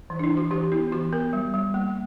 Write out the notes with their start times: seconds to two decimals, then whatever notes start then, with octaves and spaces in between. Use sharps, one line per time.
0.10 E3
0.19 D4
0.24 E4
0.30 E3
0.37 F#4
0.51 E3 G4
0.72 B3 E4
0.92 E3 F#4
1.12 B3 A#4
1.33 G3
1.54 G3
1.74 A#3